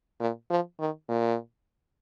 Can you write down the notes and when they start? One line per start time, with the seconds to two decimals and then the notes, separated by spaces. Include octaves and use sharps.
0.20 A#2
0.50 F3
0.80 D#3
1.09 A#2